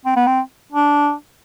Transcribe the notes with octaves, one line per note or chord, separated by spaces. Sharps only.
C4
B3
C4
D4